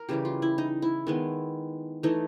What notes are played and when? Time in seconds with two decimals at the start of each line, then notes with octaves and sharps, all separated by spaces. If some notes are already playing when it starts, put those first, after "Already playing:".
Already playing: A#4
0.09 C#3 E3 G3 G4
0.25 F4
0.42 E4
0.58 D#4
0.82 E4
1.07 D#3 G#3 B3
2.03 E3 A3 D#4